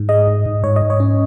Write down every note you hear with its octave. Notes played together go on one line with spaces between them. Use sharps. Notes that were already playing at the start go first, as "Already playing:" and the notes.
Already playing: G#2
G#3 D#5
G#2
G#2
G#2 C#5
D#5
G#2
C#5
C#4